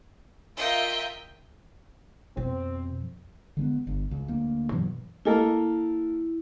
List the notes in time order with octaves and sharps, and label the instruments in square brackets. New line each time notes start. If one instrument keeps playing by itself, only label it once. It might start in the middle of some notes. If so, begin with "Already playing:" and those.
[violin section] F4 A#4 E5 [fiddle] D#5 G5
[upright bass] F2 [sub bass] B2 [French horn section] C4
[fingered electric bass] D3 G#3 B3
G1
C#2
D2 A#3
G2 B2 E3 F#3
[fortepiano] A#3 A4 A#4 [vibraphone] E4